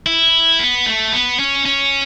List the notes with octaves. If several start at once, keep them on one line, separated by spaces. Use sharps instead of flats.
E4
B3
A3
B3
C#4
C#4